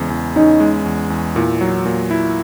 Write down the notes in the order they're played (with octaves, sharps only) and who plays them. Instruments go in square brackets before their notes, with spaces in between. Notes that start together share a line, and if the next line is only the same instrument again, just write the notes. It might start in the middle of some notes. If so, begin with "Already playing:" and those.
Already playing: [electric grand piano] E2 C#3 G#3
E2
[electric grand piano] C#4 [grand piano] D#4
[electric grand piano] G#3
E2
E2
[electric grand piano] A#2 [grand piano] E4
[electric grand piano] F#3
A#2
E4